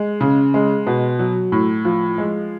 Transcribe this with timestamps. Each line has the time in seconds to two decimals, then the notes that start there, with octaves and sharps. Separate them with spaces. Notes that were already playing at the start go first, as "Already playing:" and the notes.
Already playing: G#3
0.21 C#3
0.54 G#3
0.87 B2
1.19 F#3
1.52 A2
1.85 F3
2.18 G#3